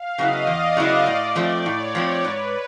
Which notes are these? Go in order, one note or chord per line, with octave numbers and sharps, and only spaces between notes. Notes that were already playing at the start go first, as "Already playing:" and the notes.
Already playing: F5
C#3 F#3 B3 E4 D#5
E2 D5
C#3 F#3 B3 E4
A2
F3 A3 C4
A2 C#5
F3 A3 C4
G#2 B4